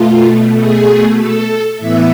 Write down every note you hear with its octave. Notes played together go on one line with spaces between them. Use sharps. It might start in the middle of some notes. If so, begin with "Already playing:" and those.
Already playing: B2 A3 F4
G#4
A4
A2 E3 B3 E5